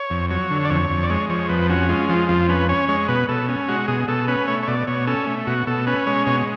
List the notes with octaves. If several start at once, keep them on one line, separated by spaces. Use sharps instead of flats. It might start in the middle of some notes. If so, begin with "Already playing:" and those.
Already playing: C#5
F2
F#3 C#5
D3
D5
F2 C#5
F2
D5
G#3 C#5
F3 C#5
F2 B4
C#4 F#4
G#3 F4
F3 F4
F2 F4
C#4 B4
C#4 C#5
G#3 C#5
B2 B4
B2 A4
C#4
G#3 F#4
B2 G#4
B2 A4
C#4 B4
A3 C#5
C#5
B2 D5
B2 C#5
C#4 A4
A3
B2 F#4
B2 A4
C#4 B4
G#3 C#5
B2 C#5